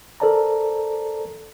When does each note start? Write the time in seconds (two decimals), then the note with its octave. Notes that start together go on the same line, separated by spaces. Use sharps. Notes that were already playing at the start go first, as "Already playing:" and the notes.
0.20 A4 A#4 C5 D5 A5 A#5